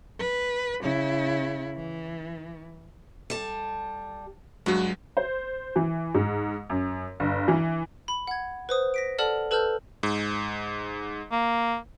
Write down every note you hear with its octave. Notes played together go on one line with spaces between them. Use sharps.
B4
C#3 E4
E3
G3 A4 A5
G2 F#3 G#3 F#4
C5
E3
G#2
F#2
G1
E3
B5
F#5 G#6
B4 C5 D#6
A#6 B6 D7
A4 D5 F#5 A5 F6
A4 B4 A5 E6 F6 G6
G#2
A#3